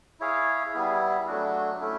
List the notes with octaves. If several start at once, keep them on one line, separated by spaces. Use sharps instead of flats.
E4 G#4 C#5 F5
G3 B3 E4 G#4
F#3 A3 D4 F#4
A3 C#4 E4